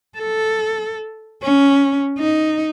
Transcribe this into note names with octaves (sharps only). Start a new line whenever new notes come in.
A4
C#4
D#4